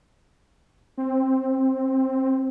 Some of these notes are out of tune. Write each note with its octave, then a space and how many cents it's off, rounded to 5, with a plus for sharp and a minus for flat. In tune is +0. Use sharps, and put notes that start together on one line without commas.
C4 +10